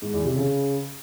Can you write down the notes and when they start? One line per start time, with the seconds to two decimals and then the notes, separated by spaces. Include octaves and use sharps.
0.02 G#2
0.13 E2
0.25 C3
0.36 C#3